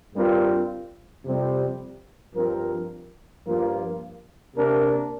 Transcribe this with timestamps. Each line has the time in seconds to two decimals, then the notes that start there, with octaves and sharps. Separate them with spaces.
0.14 G2 G3 C4 F4 A#4
1.25 F2 C3 G3 C4
2.35 G2 F3 C4 A#4
3.46 G2 F3 A#3 F4 A#4
4.56 C3 A#3 D4 A#4